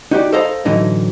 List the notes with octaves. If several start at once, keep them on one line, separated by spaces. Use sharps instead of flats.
D#4 F#4 G4 D5
A4 C5 D#5 F5 A#5
A2 D3 E3 F#3 D#4